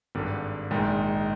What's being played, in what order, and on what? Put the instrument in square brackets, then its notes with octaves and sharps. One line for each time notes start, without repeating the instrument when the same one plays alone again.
[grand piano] G#1 G2 D3
A#1 G#2 D#3